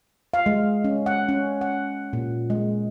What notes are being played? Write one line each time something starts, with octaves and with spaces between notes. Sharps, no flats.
F5
G#3
C#4
F#5
C#4
F#5
A#2
G#3